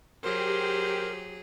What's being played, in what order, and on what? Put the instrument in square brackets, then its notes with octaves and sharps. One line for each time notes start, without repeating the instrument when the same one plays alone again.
[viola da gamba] F#3 G#4 [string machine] G4 [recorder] A#4 [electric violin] C5